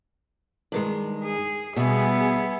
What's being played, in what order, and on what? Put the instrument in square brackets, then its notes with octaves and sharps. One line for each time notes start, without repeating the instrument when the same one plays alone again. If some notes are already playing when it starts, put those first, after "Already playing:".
[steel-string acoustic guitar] G2 D#3 G#3
[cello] G#4
[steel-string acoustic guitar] B2 [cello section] G3 G#4 [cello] B3 E5